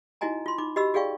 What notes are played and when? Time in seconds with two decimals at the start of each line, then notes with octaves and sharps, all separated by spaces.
0.21 D#4 E4 F#4 D#5 G#5 A#5
0.46 F4 C6
0.58 D#4 B5 D6
0.76 F#4 G4 D#5 B5 E6
0.94 F#4 G#4 D5 F5 G5 C#6